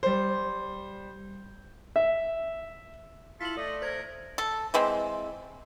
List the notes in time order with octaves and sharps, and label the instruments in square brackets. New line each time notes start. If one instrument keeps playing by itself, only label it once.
[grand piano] G3 C5
[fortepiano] E5
[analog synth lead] E4 [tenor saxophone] F4 [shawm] A4 [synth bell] B6 F#7
[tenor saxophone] A3 [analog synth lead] D5 [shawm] D#5
[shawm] A#4 [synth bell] C5 G#6
[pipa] A4
E3 G#3 C4